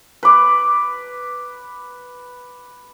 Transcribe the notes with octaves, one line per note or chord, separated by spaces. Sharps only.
B4 D6